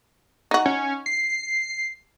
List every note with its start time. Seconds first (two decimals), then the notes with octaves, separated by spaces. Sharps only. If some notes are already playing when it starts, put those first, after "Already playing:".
0.51 D#4 F#4
0.66 C#4
1.06 C7